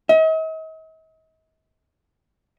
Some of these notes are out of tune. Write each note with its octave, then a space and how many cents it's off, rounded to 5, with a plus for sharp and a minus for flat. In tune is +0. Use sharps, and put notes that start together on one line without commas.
D#5 +45